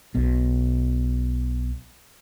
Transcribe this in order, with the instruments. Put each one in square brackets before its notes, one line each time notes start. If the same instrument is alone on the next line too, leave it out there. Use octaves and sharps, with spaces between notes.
[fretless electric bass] B1 B2